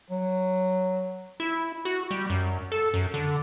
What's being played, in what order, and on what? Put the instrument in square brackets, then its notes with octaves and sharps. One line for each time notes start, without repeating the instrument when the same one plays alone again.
[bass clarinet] F#3
[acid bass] E4
F#4
G3
F#2
A4
F#2
D3